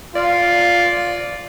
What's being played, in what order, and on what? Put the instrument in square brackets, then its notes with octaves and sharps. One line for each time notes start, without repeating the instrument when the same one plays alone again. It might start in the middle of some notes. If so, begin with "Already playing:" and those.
[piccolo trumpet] F4 [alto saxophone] D5